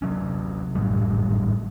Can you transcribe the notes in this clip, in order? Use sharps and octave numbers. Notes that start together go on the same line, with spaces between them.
C3 F#3 C#4
G#1 F#2 A2 G3